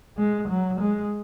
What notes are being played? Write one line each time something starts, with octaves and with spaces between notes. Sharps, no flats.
G#3
F#3
G#3